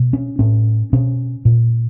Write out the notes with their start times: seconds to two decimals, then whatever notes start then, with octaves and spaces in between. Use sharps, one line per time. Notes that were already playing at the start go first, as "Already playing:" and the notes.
Already playing: B2
0.13 C#4
0.39 A2 C#4
0.93 B2 C#4
1.45 A#2